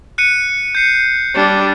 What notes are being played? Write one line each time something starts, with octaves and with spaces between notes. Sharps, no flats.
F#6 C#7 D#7
G6 C7 C#7
G3 D4